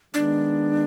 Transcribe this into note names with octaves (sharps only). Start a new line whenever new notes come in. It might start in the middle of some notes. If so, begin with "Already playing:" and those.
D#3 G#3 B3 D4